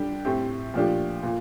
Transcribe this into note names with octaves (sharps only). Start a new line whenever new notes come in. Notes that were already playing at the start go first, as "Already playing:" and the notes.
Already playing: D3 G3 D4 G4
A2 A3 C4 G4
A#2 F3 A3 D4 G4
A#2